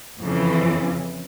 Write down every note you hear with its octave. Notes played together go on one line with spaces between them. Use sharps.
F2 C#3 E3